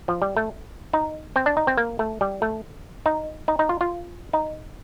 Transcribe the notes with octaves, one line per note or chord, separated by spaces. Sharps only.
F3
G3
A3
D#4
C4
D4
D#4
C4
A#3
A3
G3
A3
D#4
D#4
D#4
F4
F4
D#4